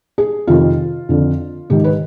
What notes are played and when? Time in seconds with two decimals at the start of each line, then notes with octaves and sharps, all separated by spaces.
0.18 G#4
0.47 F2 C3 D#3 F4
1.09 F2 D3
1.70 G#2 D#3 G4
1.84 B4